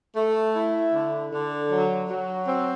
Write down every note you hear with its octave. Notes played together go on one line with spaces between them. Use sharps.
A3
E4
D3
D3
F#3
F#3
C4